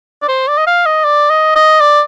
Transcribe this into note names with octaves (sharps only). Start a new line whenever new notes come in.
D5
C5
D5
D#5
F5
D#5
D5
D#5
D#5
D5